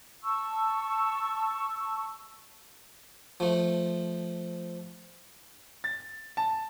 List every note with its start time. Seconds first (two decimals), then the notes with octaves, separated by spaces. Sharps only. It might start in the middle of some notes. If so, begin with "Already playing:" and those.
0.23 A5 C#6 E6
3.40 F3 A3
5.84 A6
6.37 A5